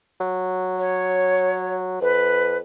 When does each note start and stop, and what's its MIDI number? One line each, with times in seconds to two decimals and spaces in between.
0.21 2.01 54
0.78 1.76 73
2.01 2.61 41
2.01 2.57 71